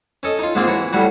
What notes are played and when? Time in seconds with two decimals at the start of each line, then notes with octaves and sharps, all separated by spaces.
0.23 C#4 A4 D#5
0.39 D#4 F4
0.55 G#2 G#3 A#3 C4 F4
0.67 E3 F#4 C#5
0.93 A2 F#3 G3 F#4